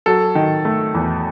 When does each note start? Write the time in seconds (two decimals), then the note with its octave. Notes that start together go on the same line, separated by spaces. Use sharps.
0.06 F#3 A4
0.35 D#3
0.65 A3
0.94 E2